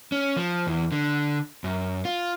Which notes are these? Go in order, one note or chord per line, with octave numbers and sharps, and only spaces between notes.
C#4
F3
E2
D3
F#2
F4